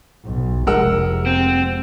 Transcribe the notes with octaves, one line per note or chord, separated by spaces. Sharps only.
B1
F1 G#3 A#4 F#5 E6
C4